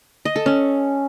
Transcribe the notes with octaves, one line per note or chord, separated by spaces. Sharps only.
D#5
A4
C#4